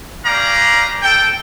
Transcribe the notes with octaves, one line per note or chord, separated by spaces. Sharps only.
C#4 G4 B4 D5 F5 A#5
A4 G5